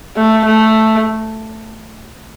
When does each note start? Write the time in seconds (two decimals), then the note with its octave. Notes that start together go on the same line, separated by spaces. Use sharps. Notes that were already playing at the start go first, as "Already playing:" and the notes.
0.16 A3
0.45 A3